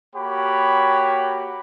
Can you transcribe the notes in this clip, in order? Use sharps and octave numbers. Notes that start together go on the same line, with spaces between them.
A#3 F#4 G4 C#5 F#5 B5